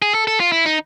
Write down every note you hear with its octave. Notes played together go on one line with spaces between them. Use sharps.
G#4
A4
A4
F4
E4
D#4